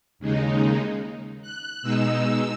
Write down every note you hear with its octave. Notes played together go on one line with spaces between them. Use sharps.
D#2 C#3 G#3 D#4
F#6
B2 G#3 D#4 E6